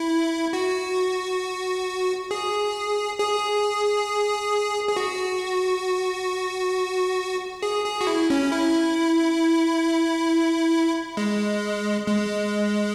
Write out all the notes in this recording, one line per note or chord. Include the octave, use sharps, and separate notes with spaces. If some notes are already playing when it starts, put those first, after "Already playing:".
Already playing: E4
F#4
G#4
G#4
G#4
F#4
G#4
G#4
F#4
E4
C#4
E4
G#3
G#3